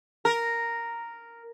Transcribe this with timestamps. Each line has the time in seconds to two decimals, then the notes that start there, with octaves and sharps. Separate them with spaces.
0.25 A#4